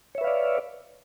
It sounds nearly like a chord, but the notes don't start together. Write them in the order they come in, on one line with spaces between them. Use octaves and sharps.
C#5 E5 B4 F5 D5